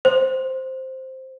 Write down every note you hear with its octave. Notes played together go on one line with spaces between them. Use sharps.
C5